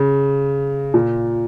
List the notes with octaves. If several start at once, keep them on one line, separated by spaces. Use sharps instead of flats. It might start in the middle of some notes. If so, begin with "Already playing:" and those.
Already playing: C#3
A#2